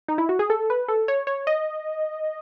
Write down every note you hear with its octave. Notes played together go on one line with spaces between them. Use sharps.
D#4
E4
F#4
G#4
A4
B4
A4
C#5
C#5
D#5